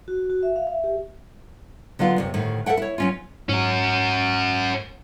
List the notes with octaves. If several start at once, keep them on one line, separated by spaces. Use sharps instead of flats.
F#4
F#4
E5
F5
E5
G4
D3 F#3 B3 F4
F#2 A2 C3
D2 A2 D#3
A4 D5 E5 F#5 G5
E4 C#5
F#3 C#4 F4
G#2 C#4 F#4